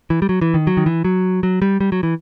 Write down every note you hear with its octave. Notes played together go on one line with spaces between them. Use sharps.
E3
G3
F#3
E3
D#3
F#3
D#3
E3
F#3
F#3
G3
G3
F#3
E3